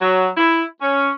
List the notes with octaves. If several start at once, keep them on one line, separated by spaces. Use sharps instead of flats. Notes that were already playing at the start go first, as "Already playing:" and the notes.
F#3
E4
C#4